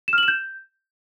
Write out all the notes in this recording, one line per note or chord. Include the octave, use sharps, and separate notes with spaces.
E7
F6
F#7
E7
G6